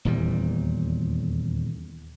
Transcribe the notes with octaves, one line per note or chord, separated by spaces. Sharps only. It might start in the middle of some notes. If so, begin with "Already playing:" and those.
D#1 E2 A#2 G3